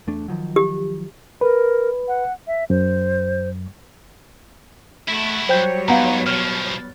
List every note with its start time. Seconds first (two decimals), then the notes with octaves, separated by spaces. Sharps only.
0.07 E2 A3 D4
0.28 D#3 F3 F#3
0.56 G4
1.41 A#4 B4
2.08 F#5
2.47 E5
2.70 F#2 C5
5.09 A3 E4 F#4
5.49 F#3 G3 C5 C#5 G5 G6
5.88 G#2 B3 F5 F#5 A#5
6.26 B2 F3 F6